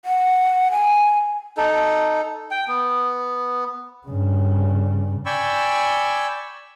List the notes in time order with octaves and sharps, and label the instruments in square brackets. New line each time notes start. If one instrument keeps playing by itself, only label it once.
[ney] F#5
G#5
[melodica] D#4 A4
G5
B3
[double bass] G2 C#3
[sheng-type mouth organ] D5 G5 G#5 B5 C#6 E6